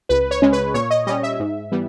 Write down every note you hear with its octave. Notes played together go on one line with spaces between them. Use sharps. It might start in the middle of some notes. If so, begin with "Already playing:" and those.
C#2 B4
C#5
C#3 G#3 C#4
B4
A#2 C#5
D#5
G3 C#4 D#5
E5
G#2
E3 G3 B3